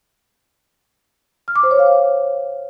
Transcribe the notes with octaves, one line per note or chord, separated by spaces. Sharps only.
F6
D6
C5
C#5
F5